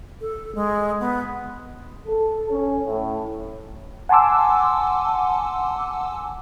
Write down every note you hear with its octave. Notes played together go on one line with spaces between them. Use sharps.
A4
G#3
B3
A4
C#4
A2
F#5 G#5 A5 C6 D6 E6